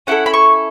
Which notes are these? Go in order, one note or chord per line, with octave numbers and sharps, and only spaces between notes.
C#4 E4 A4 F#5
B5
C#6